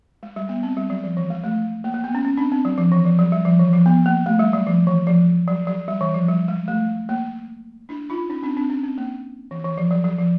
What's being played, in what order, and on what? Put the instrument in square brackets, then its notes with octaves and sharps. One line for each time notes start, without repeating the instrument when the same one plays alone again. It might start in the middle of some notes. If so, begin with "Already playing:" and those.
[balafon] G#3
G3
B3
C4
G3
F#3
F3
E3
G#3
A3
A#3
A#3
B3
C#4
C#4
C4 D4
C4
F#3
F3
E3
F3
F#3
G3
F3
E3
F3
B3
A#3
A3
G3
F#3
F3
E3
F3
F#3
F#3
G3
E3
F3
G3
G#3
A3
A#3
D4 E4
D#4 F4
C#4 D#4
C4 D4
C4 D4
C#4
C4
A#3
E3
E3
F3
F#3
F#3
F3